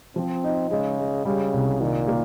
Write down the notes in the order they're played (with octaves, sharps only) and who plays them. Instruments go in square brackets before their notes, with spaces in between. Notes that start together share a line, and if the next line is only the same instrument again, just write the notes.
[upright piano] F3 [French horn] C4
[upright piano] D#4
[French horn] C#3 [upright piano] G#3
[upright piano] G#3
[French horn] C#3 [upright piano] G3
[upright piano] C2
[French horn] A#2 [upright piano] D#3
[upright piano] A#3